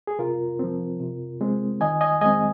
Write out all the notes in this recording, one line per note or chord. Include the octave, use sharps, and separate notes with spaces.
G#4
C3 F4 A#4
F3 C4
C3
G#3 C4
D#3 D#5 G#5
D#5 G#5
G#3 C4 D#5 G#5